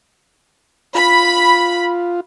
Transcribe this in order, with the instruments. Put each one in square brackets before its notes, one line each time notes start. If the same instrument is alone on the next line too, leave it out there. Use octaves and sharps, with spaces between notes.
[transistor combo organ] F4 [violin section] B5